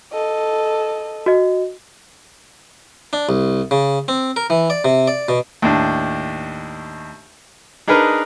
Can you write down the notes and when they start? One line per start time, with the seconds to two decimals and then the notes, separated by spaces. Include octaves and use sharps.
0.13 A4 D#5
1.26 F#4 D#5
3.13 D4
3.29 C2
3.71 C#3
4.08 C4
4.36 A#4
4.50 E3
4.70 D5
4.84 C3
5.07 D5
5.29 B2
5.62 D#2 A2 D4
7.88 D4 D#4 G#4 A#4 B4